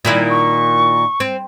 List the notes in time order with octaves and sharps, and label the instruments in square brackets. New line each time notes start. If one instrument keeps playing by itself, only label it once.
[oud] A#2 D#3 E4
[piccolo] C#6
[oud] C4